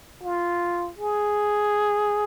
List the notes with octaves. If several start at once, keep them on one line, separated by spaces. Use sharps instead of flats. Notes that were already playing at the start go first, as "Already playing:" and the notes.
F4
G#4